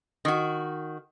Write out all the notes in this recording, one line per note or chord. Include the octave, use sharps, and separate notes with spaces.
D#3 F#4